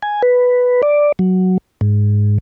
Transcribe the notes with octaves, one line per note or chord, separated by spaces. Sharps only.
G#5
B4
D5
F#3
G#2